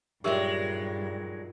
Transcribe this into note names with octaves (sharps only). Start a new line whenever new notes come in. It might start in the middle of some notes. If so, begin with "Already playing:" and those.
G2 A#2 D#3 F#3 G#3 G4 A#4 E5